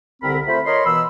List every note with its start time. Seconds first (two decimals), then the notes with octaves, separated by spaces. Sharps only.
0.22 C2 D3 C4 A#4 B5
0.47 A3 F4 C5 B5
0.66 A#4 C#5 D#5 B5 C6
0.85 B2 E3 B5 E6